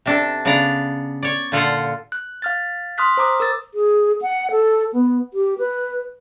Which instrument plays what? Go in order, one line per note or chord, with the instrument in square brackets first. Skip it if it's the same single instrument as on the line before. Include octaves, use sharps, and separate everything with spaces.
[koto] C3 D4 A4
C#3 B3 D4 D5 A#5
C#5 D5
A#2 D3 F4 A4 F#5
[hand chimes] F#6
F5 F6 A6
C6 D#6 F6 F#6 B6
C5 A#5 D6 D#6
A#4 E6 A6
[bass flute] G#4
F#5
A4
B3
G4
B4